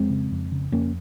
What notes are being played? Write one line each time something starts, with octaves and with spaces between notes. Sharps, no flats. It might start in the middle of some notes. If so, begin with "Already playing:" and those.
Already playing: F2 G#3 C4
C#3
F2
C#3
F2 A#3 C#4